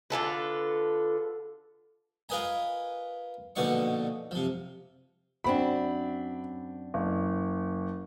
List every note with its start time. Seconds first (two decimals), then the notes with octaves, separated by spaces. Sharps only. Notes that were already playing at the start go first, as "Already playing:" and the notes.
0.10 D3 F4 A4 B4
2.29 F4 A#4 B4 D#5 G#5 A#5
3.56 A#1 B2 D3 D#4 D5 C#6
4.31 C3 F3
5.44 F#2 C4 D4 B5
6.94 F#1